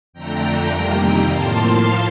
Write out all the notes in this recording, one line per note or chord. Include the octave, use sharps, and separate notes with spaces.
F2 D3 A3 D4 G5 A#5
F2 C3 D#3 G3 A#3
A2 F3 A#3 A5 C6
F5 A5